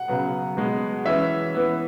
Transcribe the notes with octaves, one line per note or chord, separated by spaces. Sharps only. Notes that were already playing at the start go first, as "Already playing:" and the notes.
Already playing: F#5
C#3 F#3 B3
B2 G#3 B3
E3 C#4 E5
E3 B3